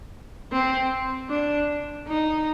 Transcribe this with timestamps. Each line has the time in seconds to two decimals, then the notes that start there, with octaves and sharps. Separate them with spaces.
0.52 C4
1.30 D4
2.08 D#4